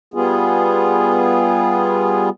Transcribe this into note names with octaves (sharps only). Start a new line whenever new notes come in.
G3 B3 F4 G#4